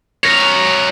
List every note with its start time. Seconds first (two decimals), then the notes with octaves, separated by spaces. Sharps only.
0.24 A#4 C#5